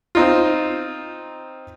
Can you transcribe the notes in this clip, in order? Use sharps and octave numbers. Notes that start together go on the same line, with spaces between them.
C4 D#4 F4